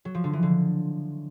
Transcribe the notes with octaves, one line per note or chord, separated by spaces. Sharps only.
F#3
F3
D3
E3
D3